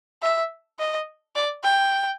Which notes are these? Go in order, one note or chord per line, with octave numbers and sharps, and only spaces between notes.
E5
D#5
D5
G5